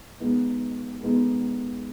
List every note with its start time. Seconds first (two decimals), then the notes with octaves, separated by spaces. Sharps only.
0.20 B2 G#3 B3 D#4
1.01 B2 G#3 B3 D#4